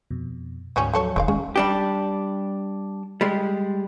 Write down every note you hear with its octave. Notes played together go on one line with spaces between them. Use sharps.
F2 B2
D2 G#2 F3 G3 C#4
F3 F#3 A3 A4 C#5
F1 D#3 G#3 D5 F5
G#3 C#4
G3 D4 G4
G3 G#3